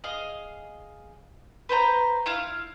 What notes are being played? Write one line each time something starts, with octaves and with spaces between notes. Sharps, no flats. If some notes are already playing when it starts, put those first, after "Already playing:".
G#4 D#5 F5
B4 C5 G#5 A#5
E4 F4 F5